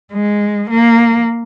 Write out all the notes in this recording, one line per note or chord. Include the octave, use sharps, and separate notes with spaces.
G#3
A#3